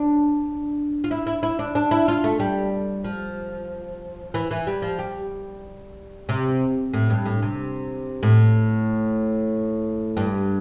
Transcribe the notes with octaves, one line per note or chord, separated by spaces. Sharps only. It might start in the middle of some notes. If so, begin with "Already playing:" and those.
Already playing: D4
F4
E4
E4
E4
D4
D4
E4
F4
A3
G3
F3
E3
E3
G3
F3
G3
C3
A2
G2
A2
C3
A2
G2